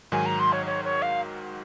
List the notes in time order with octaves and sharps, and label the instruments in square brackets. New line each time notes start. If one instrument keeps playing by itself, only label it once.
[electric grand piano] G#2 D#3 F#3 [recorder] G#5
[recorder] A#5
C6
C#5
C#5
C#5
F5